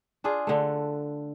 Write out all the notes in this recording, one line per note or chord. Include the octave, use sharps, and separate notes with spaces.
D4 F4 G#4
D3 A3